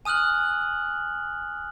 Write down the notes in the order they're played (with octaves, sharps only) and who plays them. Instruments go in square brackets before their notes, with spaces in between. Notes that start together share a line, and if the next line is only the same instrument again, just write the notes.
[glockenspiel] G#5 D#6 F6 F#6 F#7